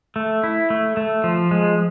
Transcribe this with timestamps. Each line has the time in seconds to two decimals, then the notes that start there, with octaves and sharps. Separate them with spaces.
0.16 A3
0.44 E4
0.70 A3
0.97 A3
1.24 F3
1.51 G#3